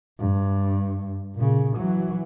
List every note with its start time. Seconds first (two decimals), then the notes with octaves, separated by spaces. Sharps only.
0.19 G2
1.35 A#2 C#3
1.76 E3 F#3